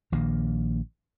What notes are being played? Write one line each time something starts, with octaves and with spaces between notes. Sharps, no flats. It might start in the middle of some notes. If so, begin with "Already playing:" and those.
A#1 D#3 A#3